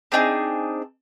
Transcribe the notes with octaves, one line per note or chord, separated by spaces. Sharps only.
C4 D4 D#4 G#4